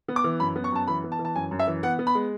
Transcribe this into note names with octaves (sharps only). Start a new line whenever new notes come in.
B3
D6
E3
F#2 B5
B3
C#6
F#2 A5
E3 B5
B3
A5
E3
A5
F#2 G#5
F#2
E5
E3
B3 F#5
B3
B5
G#3